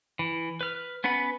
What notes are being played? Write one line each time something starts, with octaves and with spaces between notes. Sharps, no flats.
E3
B4 F6
B3 C#4 B4 F#5 B5